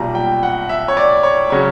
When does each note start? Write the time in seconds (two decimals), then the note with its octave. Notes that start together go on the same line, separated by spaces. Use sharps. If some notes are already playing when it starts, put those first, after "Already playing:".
Already playing: B1 A#2 G3 A#5
0.15 G5
0.43 F#5
0.69 E5
0.88 C#5
0.97 D5
1.23 C#5
1.50 C#3 F#3 C#5